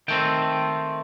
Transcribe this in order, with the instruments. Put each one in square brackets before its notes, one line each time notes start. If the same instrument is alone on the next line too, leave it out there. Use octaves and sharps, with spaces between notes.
[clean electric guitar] D#3 A3 C4 G5